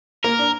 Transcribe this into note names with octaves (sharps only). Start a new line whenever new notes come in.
A#3 A#4
D4